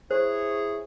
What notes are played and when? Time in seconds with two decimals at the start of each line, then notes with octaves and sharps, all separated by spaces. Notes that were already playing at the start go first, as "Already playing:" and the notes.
0.11 E4 G#4 C5 C#5